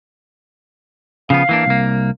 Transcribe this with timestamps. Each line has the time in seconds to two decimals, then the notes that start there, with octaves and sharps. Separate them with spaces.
1.30 C#3 F3 B3 F5
1.49 E3 A#3 D4
1.66 C2 A#3